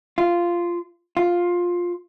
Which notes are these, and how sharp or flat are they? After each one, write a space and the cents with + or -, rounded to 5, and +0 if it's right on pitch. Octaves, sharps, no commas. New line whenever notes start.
F4 -10
F4 +10